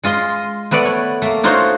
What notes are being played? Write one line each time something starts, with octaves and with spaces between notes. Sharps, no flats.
G#3 F4 D#5 C6
A3 B3 B4 D5 F#5
C#5
A3 A#3
D4 D#4 F4 F#4 C5 C#5